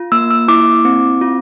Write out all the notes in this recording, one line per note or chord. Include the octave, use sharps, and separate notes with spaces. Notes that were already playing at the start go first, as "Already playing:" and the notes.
Already playing: F4
A#3 E6
E6
E4 D6
C4
F4